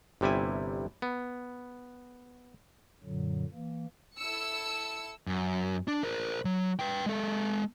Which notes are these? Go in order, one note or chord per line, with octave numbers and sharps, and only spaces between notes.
G1 C3 G3 E4 G#5
B3
F#2 A#2 D3 F#3
E3 A#3
E4 A4 E6 C#7
F#2
D4
A#4 C5
F#3
B4 G5
G#3 A4